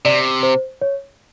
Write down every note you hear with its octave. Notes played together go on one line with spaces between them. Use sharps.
C3 D5
C5
C#5